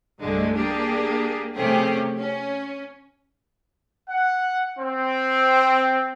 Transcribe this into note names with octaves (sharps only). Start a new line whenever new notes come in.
C2 G2 D3 G#3 A3
A#3 D4 G4 G#4
C3 F3 A3 C#4 G4 G#4
C#4
F#5
C4